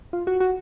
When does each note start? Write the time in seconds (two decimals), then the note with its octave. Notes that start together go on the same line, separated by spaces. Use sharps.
0.13 F4
0.27 F#4
0.40 F#4